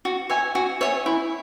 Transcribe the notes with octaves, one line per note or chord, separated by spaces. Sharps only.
F#4
C#5 E5 G#5
F#4
C#5 E5 G#5
E4